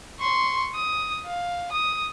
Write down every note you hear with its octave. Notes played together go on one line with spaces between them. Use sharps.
C6 C#6
D#6
F5
D#6